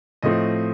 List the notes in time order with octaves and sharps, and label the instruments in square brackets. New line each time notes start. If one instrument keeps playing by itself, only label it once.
[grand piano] A2 F3 A3 C4 D#5